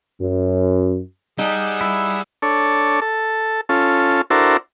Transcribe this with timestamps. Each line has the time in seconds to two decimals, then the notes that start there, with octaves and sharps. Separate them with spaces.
0.20 F#2
1.39 G3 D#4 G#4 F#5 E6
1.81 E4
2.42 D4 A4 C#5
3.02 A4
3.69 C#4 F4 A4
4.30 D4 E4 F#4 A4 A#4 C5